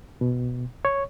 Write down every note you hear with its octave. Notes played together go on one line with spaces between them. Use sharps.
B2
C#5